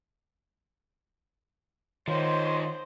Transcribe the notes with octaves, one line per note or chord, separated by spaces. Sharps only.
D#3 F3 D#4 C5 C#5 C6